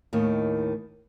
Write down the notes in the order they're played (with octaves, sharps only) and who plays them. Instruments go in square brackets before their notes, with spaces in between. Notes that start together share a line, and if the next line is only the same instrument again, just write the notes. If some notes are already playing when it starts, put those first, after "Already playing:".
[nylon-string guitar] D#2 A2 D#3